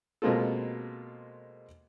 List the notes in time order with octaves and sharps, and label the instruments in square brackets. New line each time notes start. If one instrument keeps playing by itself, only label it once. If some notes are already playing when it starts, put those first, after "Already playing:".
[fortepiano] B2 G#3 A#3 C4 F4 A4